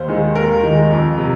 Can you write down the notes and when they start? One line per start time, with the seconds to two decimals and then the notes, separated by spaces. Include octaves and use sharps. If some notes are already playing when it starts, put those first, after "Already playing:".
Already playing: D#2 C5
0.08 D#3 G#3
0.35 D#2 A#4
0.63 D#3 G#3
0.91 F2
1.18 C3